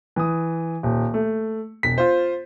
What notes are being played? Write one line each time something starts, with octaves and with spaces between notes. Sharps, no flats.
E3 D#6
D#1
A3
E1 B6
F4 C5